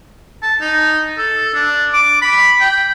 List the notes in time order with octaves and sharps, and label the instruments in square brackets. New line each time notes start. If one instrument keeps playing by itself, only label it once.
[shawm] A5
D#4
A4
D4
D6
B5
G5